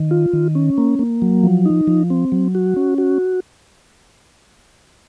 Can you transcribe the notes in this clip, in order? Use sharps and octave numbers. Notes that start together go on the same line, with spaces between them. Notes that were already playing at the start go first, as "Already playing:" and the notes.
Already playing: D#3
F4
D#3
C#4
A#3
A#3
F#3
F3
D#4
F3
C4
F#3
F#4
C#4
F#4